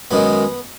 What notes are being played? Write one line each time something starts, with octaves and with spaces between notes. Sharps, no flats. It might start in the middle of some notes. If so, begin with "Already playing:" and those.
F#2 D#3 G#3 B3